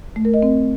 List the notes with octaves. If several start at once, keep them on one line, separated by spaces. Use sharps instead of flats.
A3
A#4
D#5
C4